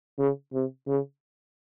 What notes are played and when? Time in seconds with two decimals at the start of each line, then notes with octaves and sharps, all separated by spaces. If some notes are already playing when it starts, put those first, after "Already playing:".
0.18 C#3
0.53 C3
0.88 C#3